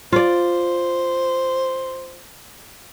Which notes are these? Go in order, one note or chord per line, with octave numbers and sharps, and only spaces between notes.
F4 C5 D5